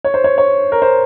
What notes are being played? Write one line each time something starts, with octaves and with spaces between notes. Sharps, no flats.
C#5
C5
C#5
C#5
A#4
C5